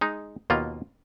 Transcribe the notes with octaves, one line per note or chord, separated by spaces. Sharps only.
G#3 D#4
D#2 B2 A#3 F4